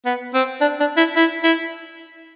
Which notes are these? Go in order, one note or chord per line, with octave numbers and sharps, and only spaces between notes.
B3
C4
D4
D4
E4
E4
E4